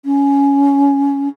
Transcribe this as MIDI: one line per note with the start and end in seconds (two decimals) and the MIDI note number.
0.05 1.28 61